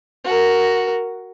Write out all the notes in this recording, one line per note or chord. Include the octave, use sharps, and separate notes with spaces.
F#4 A#4